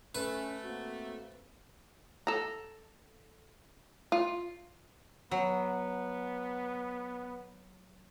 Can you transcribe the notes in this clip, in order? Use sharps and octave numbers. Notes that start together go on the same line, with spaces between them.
A3 C#4 B4
A#3 C4 F#4
A4 A#5
F4
F#3 B3